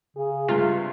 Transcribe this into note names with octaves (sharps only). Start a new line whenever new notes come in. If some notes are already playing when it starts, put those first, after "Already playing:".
C#3 G#4
G2 C3 F4